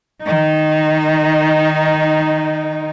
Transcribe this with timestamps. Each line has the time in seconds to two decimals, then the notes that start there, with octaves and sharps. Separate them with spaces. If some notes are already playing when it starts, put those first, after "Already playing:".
0.23 D#3 D#4